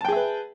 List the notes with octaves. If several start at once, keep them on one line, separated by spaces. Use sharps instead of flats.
G#4 B4 E5 G5 A5